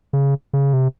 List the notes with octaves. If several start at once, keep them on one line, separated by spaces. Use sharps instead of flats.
C#3
C#3
C3